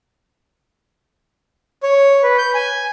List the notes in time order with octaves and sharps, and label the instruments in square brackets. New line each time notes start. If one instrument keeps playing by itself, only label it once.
[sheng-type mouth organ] C#5
B4
G6
G#5